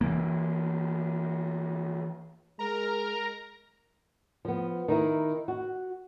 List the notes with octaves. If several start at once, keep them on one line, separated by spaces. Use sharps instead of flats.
E3 A#3
G#3 A#4 A#5
F3 B3
D#3 D#4 E4
F#4